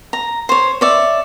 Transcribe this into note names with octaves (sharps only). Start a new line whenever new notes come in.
A#5
C5 C#5
C#5 D5 E5